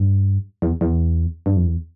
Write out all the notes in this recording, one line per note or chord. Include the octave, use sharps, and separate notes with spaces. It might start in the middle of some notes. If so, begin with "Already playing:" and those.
Already playing: G2
E2
E2
G2
F2
E2